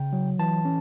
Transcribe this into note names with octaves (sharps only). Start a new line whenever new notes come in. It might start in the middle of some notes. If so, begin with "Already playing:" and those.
Already playing: C#3 G5
F#3
E3 A5
C#4